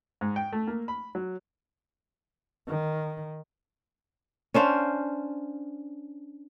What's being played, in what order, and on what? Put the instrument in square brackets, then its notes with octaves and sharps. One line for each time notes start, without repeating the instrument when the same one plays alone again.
[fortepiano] G#2
G5
A3
A#3
B5
F#3
[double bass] D#3
[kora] C#4 D4 C5 F5